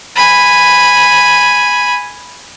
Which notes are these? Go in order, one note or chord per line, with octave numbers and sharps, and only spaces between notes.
G#5 B5